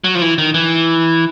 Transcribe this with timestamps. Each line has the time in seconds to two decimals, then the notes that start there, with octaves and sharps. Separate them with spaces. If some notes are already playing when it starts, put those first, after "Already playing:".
0.04 F#3
0.15 F3
0.22 E3
0.38 D#3
0.54 E3